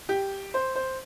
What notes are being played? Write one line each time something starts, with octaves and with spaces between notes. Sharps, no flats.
G4
C5
C5